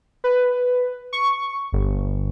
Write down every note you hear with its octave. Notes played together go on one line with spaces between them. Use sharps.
B4
C#6
G1